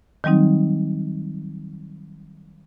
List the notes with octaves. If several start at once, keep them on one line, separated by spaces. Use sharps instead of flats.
D#3 F#3 G3 C4 D#4